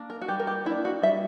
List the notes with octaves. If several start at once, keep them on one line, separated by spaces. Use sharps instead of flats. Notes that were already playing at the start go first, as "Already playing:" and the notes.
Already playing: A#3 D4
A#4
F#4
G3 G4
A#4
G4
A#3 E4
D4
F#4
G3 E5